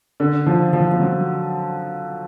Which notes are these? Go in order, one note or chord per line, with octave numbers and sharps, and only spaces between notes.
D3
F3
F3
F3
F#3